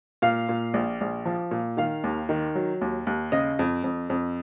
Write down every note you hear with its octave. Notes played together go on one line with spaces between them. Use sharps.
A#2 F5
A#2
A#1
A#1
F3
A#2
D#3 F5
D#2
D#3
F#3
D#2
D#2
C#3 D#5
F2
F2
F2